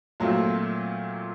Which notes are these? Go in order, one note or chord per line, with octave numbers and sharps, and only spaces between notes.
A#2 F#3 A3 C4 F4